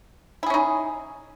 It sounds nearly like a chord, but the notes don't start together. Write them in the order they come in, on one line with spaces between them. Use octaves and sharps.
E4 G#4 C#4 D#4